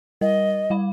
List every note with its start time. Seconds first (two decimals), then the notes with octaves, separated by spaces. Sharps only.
0.21 G3 A#4 D#5
0.70 G3 F5 B5